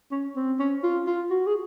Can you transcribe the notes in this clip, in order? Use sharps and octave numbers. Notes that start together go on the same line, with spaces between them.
C#4
C4
C#4
F4
F4
F#4
G#4